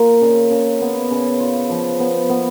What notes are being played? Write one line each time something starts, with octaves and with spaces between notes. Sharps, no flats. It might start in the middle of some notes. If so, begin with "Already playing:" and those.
Already playing: A#3 F4
C#3
C#3
B3
C#3
F4
F3
B3
B3